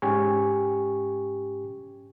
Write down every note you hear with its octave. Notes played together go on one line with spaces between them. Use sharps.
G#2 C#4 G4 G5 G#5 C#6